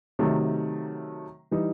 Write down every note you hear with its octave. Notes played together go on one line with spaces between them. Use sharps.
C3 D#3 F#3 A3
E3 G3 D#4